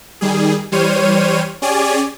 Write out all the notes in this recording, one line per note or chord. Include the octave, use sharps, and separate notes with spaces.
D#3 G3 G#4
E3 G3 C5 C#5 F6 D#7
C#4 G4 G#4 D5 G#5